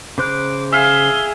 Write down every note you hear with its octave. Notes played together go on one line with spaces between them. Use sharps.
C#3 C5 D6 F#6
G#4 E5 F5 G7